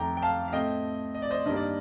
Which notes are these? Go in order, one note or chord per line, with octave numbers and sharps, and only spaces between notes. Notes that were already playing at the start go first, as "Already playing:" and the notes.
Already playing: F2 D#3 A3 G5 A#5 D6
G5
F5 A5
F5
A2 A3 C4 D#5 G5
D#5
D5
C5 D#5
G2 D#3 G3 A#3 D#5
D5